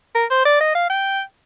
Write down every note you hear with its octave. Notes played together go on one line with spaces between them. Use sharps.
A#4
C5
D5
D#5
F5
G5